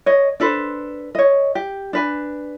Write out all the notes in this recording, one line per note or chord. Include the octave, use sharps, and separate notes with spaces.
C#5 D#5
D4 A4 B4 C5
C#5 D#5
G4
D4 B4 G#5